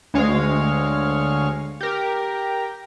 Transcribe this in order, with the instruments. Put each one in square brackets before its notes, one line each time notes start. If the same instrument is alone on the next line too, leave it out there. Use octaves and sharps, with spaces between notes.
[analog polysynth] D2 G#3 C#5 F5
G4 A#4